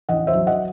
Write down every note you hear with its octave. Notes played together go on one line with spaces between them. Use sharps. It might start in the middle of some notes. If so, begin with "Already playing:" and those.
A1 D#5 F#5
C5 E5
F#3
D#5 F#5